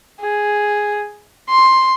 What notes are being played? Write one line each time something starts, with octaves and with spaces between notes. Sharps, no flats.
G#4
C6